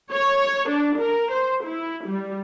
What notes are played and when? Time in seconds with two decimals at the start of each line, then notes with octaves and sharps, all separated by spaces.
0.12 C#5
0.69 D4
0.98 A#4
1.31 C5
1.64 E4
2.06 G3